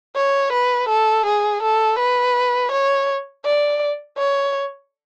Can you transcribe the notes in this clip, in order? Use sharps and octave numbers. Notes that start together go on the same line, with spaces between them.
C#5
B4
A4
G#4
A4
B4
C#5
D5
C#5